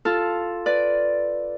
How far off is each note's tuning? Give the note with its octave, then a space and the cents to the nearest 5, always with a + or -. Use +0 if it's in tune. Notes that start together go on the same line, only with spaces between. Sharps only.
F4 +0 A4 +0
B4 +0 D5 +0